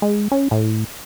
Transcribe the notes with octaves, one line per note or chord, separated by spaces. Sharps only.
G#3
C#4
A2